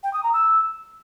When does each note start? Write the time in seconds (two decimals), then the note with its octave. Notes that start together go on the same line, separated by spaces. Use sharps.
0.03 G5
0.13 D#6
0.23 A#5
0.33 E6